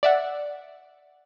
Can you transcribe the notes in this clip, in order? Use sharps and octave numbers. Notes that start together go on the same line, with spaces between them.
D5 E5 F#5